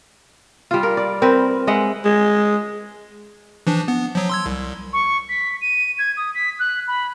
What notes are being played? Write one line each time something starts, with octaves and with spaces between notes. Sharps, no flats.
G3 F4
A#4
D5
C4 A#4 B4
G#3 D#5 E5 F#5
G#3
E3 F3 D4
B3
F3 F#3
C6 E6 G#6
C2
C#6
B6
D#7
G#6
D#6
B6
F#6
B5